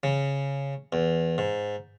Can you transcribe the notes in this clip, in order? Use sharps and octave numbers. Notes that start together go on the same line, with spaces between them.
C#3
E2
G#2